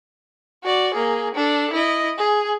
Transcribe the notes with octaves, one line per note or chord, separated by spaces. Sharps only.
F#4 D5
A#3 G#4
D4 A4
E4 D#5
G#4